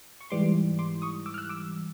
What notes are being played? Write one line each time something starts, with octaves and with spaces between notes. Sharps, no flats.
C#6
G#2 E3 G3 C6 D6
C6 D6
C#6 D#6
D6 E6
F6
E6 F#6
D6 E6